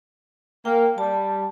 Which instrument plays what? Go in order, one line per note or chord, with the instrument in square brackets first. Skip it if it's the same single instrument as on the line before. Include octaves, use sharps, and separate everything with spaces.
[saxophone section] A#3 [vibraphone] G5
[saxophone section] G3 [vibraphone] A5